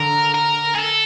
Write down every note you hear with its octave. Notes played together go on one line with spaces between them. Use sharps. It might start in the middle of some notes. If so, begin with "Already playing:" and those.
Already playing: D3 A#4
A#4
G#4
A4